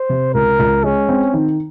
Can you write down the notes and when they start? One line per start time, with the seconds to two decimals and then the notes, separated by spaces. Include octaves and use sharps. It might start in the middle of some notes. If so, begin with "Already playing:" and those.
Already playing: C5
0.09 C3
0.34 C#2 A#4
0.59 C#2
0.84 G#3 C#4
1.09 C4
1.34 D#3